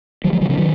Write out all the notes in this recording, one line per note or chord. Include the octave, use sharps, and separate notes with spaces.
D#3 F#3
F3 G#3
D#3 F#3
C#3 F3
D#3 F#3